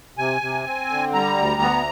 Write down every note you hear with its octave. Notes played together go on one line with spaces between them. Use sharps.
C3 G#5
C3
C4
D3
G3 A#5
D2
B3